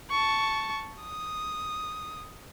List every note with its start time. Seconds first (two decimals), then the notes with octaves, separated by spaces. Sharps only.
0.10 A5 C#6
1.03 D#6